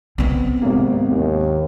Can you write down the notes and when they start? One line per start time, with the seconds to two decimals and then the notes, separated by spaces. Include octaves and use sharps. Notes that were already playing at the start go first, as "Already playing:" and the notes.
0.18 B3 C4
0.62 G#1 C3 A#3
1.08 D#2